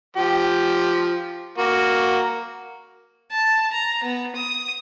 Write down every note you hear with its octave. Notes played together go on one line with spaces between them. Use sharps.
F3 G4
A#3 F#4
A5
A#5
B3
D#6